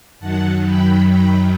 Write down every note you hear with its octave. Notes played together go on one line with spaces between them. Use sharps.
F#2 D#3 F#3 F#5 A5
G5 B5
G5 B5